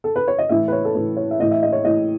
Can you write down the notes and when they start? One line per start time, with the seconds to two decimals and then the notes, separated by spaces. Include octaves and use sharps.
0.04 A4
0.16 B4
0.28 C#5
0.38 D#5
0.49 A2 E3 E5
0.68 B4
0.72 C#5
0.85 A4
0.95 A2 E3 B4
1.17 C#5
1.31 E5
1.40 A2 E3 D#5
1.51 E5
1.63 D#5
1.73 C#5
1.84 A2 E3 D#5